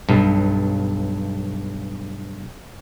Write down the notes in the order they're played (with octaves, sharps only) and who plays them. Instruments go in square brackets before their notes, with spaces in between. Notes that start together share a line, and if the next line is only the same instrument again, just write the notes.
[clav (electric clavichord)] B1 G2